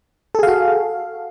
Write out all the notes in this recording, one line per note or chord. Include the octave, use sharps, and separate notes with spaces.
F#4 G#4 A4 F5